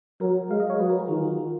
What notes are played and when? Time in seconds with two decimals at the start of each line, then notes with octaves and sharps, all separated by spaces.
0.21 F#3 A#4
0.50 G#3 F5
0.60 D#5
0.70 C#5
0.79 F#3 B4
0.90 A#4
0.99 G#4
1.08 D#3 F4
1.23 F#4
1.38 F4